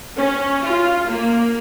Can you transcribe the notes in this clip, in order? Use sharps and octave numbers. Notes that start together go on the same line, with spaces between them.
C#4
F4
A#3